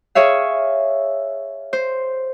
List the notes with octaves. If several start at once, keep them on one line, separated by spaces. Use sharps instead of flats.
G#4 C#5 E5 F5
C5